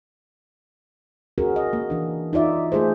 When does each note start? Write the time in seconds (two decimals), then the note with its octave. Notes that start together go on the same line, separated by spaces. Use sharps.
1.38 C#4 F#4 G#4 A#4
1.56 D#5
1.73 A#3
1.90 E3 D4
2.33 D#4 F4 D5 E5
2.72 A3 F4 G#4 A4 C5